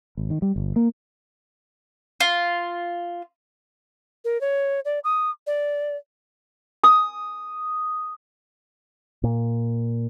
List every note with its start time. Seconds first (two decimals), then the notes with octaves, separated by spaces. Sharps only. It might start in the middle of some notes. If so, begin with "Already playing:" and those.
0.17 G#1
0.30 D#3
0.42 G3
0.56 G1
0.76 A#3
2.20 F4
4.25 A#4
4.41 C#5
4.85 D5
5.04 D#6
5.47 D5
6.83 D#6
9.24 A#2